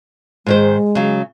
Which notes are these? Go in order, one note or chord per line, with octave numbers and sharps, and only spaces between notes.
G#2 D#3 G#3 C5
C#3 F#3